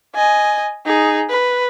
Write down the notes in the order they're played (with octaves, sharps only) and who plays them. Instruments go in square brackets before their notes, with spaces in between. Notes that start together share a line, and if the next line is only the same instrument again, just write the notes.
[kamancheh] D#5 G#5
D#4 G#4
B4